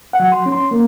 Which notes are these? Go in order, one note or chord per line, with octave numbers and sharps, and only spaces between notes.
F#5
F#3
C6
C#4
C6
A#3